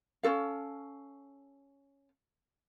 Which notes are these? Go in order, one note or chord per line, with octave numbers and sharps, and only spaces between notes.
C#4 F#4 A4 F5